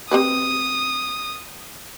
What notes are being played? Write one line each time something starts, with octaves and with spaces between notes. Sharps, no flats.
C4 G4 B4 D#6